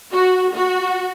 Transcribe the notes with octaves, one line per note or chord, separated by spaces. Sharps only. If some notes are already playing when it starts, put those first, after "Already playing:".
F#4
F#4